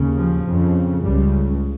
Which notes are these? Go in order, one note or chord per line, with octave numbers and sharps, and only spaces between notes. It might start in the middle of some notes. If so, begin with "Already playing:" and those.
Already playing: D#2 C#3
F3
F2 C#3
C#2 C#3 G3